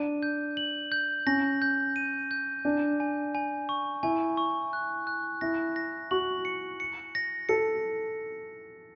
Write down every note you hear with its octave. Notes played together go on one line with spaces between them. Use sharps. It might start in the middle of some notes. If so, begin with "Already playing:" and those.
Already playing: D4 D#7
G6
F#7
G6
C#4 A#6
G6
D#7
G6
D4 G#5
G#5
G#5
C#6
E4 G#5
C#6
F#6
F#6
E4 A#6
A#6
F#4 F#7
C#7
C#7
A#6
A4 C#7